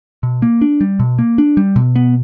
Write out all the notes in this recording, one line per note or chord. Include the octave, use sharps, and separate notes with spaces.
B2
A#3
D4
G3
B2
A#3
D4
G3
B2
B3